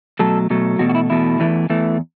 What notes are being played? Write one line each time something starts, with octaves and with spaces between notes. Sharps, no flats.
B2 F#3 A3 A4
B2 F#3 A3
E2 B2 A3 F#4
F#4
E4
E2 B2 A3 E4
E2 E3 A3
E2 E3 A3